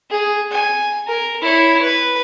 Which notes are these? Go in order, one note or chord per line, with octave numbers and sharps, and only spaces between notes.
G#4
G#5
A#4
E4 C#5
B4